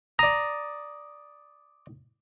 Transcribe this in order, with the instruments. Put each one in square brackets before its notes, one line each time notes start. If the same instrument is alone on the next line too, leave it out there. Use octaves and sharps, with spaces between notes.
[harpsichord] D5 D#6 [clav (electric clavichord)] A#5